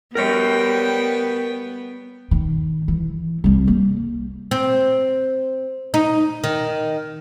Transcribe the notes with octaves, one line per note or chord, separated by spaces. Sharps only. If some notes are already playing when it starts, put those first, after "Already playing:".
G3 B3 A#4 C#5 G5
D#3
E3
C2 G3
A#3
C4
D#4
D#3